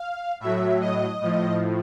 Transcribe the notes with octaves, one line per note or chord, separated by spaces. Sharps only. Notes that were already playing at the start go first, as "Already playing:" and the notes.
Already playing: F5
A2 F#3 E5
D#5
A2 F3